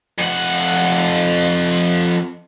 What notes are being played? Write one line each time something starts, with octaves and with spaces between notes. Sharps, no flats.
F2 F#5